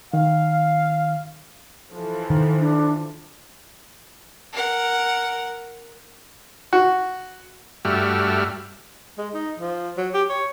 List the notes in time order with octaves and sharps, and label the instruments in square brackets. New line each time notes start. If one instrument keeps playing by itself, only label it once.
[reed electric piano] D#3 [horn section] F5
[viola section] E3 F3 A4
[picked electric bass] D#3
[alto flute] D4
[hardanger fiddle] A#4 F#5
[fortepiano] F#4
[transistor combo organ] G2 G3 A3 F#4 E5 F6
[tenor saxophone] G#3
D#4
F3
F#3
G4
C#5